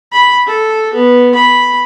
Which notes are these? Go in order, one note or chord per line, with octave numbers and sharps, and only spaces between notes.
B5
A4
B3
B5